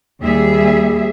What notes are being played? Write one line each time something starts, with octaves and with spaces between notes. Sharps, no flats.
D#2 G3 G#4 E5